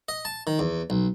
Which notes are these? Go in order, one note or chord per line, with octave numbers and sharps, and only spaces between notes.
D#5
A5
D#3
E2
B1